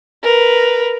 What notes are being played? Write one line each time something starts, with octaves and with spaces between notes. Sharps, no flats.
A#4 B4